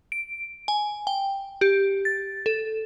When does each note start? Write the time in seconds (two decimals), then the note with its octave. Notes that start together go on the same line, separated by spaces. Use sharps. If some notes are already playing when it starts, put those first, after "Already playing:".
0.12 D7
0.68 G#5
1.07 G5
1.61 G4
2.05 A6
2.46 A4